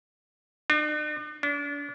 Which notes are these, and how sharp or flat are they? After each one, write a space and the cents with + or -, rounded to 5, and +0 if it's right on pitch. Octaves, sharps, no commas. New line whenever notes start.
D4 +45
D4 -35